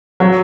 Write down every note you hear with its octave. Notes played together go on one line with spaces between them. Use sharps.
F#3